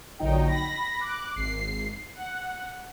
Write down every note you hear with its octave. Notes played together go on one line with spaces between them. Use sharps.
A#1 D3 F#3 D#4 G5
B5 A#6
D6 F#6
G#1 C7
F#5